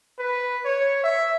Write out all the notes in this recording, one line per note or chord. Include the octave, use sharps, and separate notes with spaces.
B4
C#5
E5